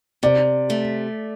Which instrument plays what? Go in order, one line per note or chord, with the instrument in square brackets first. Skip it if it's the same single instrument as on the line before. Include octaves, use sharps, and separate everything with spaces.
[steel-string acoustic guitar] C3 [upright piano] D5
[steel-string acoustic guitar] A3